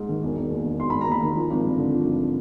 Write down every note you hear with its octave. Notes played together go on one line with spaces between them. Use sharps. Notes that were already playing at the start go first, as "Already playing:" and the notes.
Already playing: G#2
D#3
E1
E1
D#2
D#3
E1 C6
E1 B5
A#5
D#2 B5
D#3
F3
G#1
G2
D3
F3
G#1